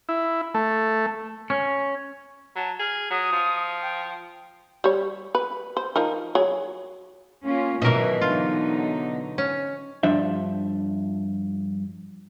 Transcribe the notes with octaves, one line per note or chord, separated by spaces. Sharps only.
E4
A3
C#4
F#3 A5
G#4 F6
F#3 D#6
F3
G5
G3 C#5
B4
C5
F3 D#4 A#4
F#3 G#4
A#3 C#4 F4
G#2 B2 D#3 E3 F#3 A#4 D#5
D3 F#3 D#4 F4
C#4
G2 F3 D4 E5